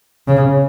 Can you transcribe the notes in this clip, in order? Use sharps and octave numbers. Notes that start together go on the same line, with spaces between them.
C#3